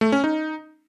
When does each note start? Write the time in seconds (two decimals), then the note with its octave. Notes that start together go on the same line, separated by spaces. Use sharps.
0.01 A3
0.12 C#4
0.24 D#4